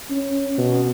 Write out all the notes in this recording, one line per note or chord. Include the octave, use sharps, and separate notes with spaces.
C#4
B2